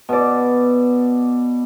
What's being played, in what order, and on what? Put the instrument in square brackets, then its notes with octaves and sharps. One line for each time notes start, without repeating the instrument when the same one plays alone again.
[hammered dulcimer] B2 D5